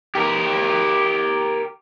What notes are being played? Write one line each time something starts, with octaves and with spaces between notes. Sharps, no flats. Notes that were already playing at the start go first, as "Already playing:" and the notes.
G4 A#4